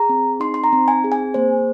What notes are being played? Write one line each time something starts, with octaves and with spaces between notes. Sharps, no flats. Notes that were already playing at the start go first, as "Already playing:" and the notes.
Already playing: G#4 A#5
C4
D#4 C6
C6
A#5
C4
G#5
G#4
G#5
A#3 C5